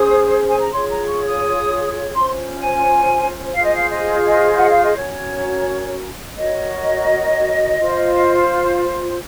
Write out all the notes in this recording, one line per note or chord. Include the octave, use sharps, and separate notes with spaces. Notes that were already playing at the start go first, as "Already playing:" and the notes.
Already playing: C#4 G#4 C5 D#6
G#5
A#5
F4 G#4 C#5 C6
A#5
C#6
D#6
C#4 F4 C5 C6
G#5
F4 G#4 C5 F5
D#5
F5
D#5
D#5
F#5
F5
D#5
C#4 F#4 A#4 C#5
F#4 A#4 C#5 D#5
F4 C5